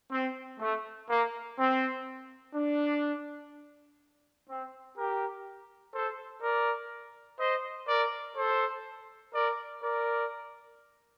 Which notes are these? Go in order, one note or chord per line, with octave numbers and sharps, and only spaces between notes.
C4
A3
A#3
C4
D4
C4
G4 A#4
A4 C5
A#4 D5
C5 D#5
A#4 D5
A4 C5
A#4 D5
A#4 D5